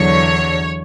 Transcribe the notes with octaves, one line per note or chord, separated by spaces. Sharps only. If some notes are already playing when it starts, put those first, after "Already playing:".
Already playing: E2 D3 F#3 C#5